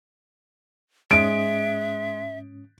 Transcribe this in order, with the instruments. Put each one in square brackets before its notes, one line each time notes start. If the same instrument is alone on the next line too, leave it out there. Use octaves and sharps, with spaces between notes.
[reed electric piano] G#2 C#4 D#6 [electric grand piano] G#3 [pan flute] E5 [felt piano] D7